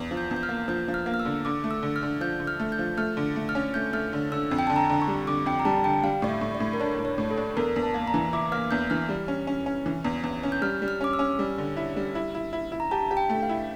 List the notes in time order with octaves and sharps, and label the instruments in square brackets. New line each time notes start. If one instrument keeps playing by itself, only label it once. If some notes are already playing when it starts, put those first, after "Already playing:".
Already playing: [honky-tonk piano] E2
F3
[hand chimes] G6
[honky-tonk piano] E2
[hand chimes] G6
F6
[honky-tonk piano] A#3
[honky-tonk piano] F3 [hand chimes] G6
[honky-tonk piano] F3
[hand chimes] F6
[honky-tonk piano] A#3
[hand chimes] F6
E6
[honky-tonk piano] D3
[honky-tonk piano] D3 [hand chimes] D6
[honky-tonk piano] A3
[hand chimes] E6
[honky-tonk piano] D3
[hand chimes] F6
[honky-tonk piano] D3
[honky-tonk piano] F3 [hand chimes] G6
[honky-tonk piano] D3
[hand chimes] F6
[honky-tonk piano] A3
[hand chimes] G6
[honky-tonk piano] F3
[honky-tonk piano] A3 [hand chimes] F6
[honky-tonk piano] D3
A3
[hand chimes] F6
[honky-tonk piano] C#4
[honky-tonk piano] A3 [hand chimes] G6
[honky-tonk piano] A3 [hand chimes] F6
[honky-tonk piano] D3
[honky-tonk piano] D3 [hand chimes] E6
[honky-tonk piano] F2
[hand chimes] G5
[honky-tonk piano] D3 [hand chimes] A5
[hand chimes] A#5
[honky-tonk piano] D3
[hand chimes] C#6
[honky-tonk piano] G3
[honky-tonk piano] D3 [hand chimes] D6
[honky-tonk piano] F2 [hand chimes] G5
[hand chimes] A#5
[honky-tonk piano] G3 [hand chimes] A5
[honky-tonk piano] D3 [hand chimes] G5
[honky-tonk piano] G3 [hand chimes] F5
[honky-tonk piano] A2 [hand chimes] D5
[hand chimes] E5
[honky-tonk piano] A2
[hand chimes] D5
[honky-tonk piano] A2
[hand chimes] A#4
[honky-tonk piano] D4 [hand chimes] C#5
[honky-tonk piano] A2
[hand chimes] C#5
[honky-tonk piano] A2
[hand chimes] A4
[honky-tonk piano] D4
[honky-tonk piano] E2 [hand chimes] A#4
[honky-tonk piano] E2
[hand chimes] A5
[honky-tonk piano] A#3
[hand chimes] A#5
[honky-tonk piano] E3
[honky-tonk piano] E4 [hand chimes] D6
[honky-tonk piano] A#3 [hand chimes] F6
[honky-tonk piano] E2 [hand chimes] G6
[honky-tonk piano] E3 [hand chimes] F6
[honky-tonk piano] G3
C#4
C#4
C#4
E3
E2
E2
C#4
[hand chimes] G6
[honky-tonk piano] G3 [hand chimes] F6
[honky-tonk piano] G3
[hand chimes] F6
[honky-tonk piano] C#4 [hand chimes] D6
[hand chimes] E6
[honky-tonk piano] C#4
G3
D3
E4
G3
E4
E4
E4
E4
[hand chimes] A#5
[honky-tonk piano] G4 [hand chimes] A5
[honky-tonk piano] G4
[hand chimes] G5
[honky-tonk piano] A3
[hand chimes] F5
[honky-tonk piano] E4